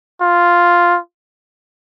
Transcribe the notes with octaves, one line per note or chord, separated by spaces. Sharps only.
F4